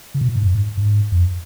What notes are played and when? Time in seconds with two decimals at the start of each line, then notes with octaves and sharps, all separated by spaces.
0.14 C#3
0.21 B2
0.29 A#2
0.36 G#2
0.43 F#2
0.55 G#2
0.77 G#2
1.12 F2